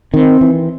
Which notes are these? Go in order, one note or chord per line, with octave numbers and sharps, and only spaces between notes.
D#3 C4
E3